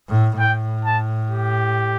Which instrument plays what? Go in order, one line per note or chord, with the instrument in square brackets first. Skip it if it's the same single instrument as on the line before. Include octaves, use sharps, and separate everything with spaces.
[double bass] A2
[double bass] A2 [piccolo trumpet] G5
[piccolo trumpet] A5
G4